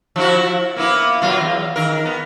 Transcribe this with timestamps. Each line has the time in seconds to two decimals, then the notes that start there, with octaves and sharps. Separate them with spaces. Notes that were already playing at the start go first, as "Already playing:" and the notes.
0.16 F3 E4 F#4
0.76 A#3 B3 E4
1.22 B2 F#3 F4
1.41 E2
1.76 D#3 A#4
2.06 B3